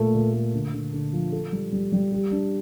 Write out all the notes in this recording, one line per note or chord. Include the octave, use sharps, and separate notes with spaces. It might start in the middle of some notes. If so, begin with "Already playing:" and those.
Already playing: A#2 A3
A#2
A3
D3
D3
D3
F3
A4
G3
G3
G3
G4
D4